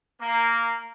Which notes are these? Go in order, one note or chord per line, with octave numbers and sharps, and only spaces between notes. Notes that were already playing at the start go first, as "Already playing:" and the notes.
A#3